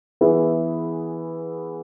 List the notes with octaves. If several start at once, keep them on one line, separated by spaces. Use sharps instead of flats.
E3 B3 E4 G#4